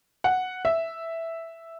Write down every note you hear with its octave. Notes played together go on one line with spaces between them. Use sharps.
F#5
E5